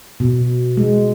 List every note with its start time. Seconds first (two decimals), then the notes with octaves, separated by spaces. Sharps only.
0.20 B2
0.77 G#3